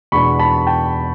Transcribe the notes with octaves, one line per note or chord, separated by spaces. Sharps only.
E2 B2 G#3 B3 D4 B5 C#6
A5 B5
G5 A5